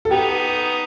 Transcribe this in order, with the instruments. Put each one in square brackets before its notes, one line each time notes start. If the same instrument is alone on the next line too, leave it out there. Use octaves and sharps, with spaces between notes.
[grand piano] A4
[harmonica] B3 D#4 [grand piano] G4